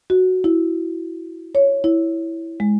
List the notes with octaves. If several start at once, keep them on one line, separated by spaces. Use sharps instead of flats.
F#4
E4
C#5
E4
G#3